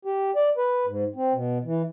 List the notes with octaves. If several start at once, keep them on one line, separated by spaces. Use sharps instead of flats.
G4
D5
B4
G#2
C4
B2
E3